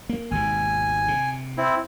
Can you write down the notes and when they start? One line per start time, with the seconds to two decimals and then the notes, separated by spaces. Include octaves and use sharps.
0.09 A#3
0.31 G#1 D#2 B2 G#5
1.08 C3
1.57 C4 E4